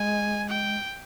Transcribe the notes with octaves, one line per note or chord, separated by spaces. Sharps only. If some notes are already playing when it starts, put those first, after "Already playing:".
Already playing: G#3 G#5
G5